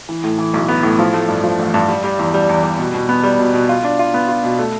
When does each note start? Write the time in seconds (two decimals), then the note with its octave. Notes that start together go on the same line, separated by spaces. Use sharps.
0.09 E3
0.24 A2
0.39 E3
0.54 B1
0.68 B3
0.83 A2
0.99 F3
1.14 A3
1.28 G2
1.44 F3
1.59 A1
1.74 G2
1.89 G3
2.04 G3
2.19 E2
2.34 G3
2.49 E2
2.64 G3
2.79 B2
2.94 B2
3.09 B3
3.23 G3
3.39 B2
3.54 B2
3.69 F4
3.84 D4
3.99 F4
4.14 B3
4.28 F4
4.44 B2
4.59 A3